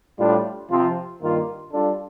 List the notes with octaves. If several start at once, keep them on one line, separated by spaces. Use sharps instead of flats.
A2 G3 D4 F4
C3 F3 C4 F4
G2 D#3 A#3 F4
G3 D4 F4 A4